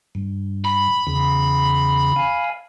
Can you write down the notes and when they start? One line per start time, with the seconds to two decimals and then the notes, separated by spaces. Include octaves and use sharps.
0.15 G2
0.65 B5
1.07 E2 C#3
2.16 F5 G#5